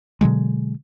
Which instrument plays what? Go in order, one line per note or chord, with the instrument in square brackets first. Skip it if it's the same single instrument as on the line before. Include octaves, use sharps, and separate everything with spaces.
[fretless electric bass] B2 D3 F#3 G#3